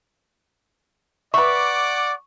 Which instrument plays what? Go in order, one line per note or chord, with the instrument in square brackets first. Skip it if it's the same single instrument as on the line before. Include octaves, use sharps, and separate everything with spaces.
[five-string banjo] B4 E5 [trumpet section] D5 F#5 D6 [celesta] C#6